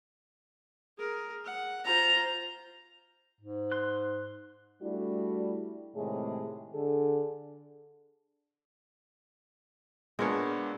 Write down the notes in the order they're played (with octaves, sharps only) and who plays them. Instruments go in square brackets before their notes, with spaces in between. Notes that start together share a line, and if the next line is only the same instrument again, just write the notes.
[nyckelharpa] G#4 A#4
F#5
[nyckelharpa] F4 C5 [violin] A#5
[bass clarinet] G#2
[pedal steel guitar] C6 F#6
[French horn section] G3 A3 D4 E4 F#4
A2 C3 D#3 G#3 G#4
D3 G#4 A4
[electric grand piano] A#2 B3 D4 [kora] G#3 A#4 C#5